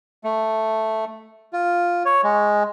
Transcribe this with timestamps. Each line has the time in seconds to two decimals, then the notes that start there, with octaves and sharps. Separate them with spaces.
0.24 A3
1.53 F4
2.05 C#5
2.24 G#3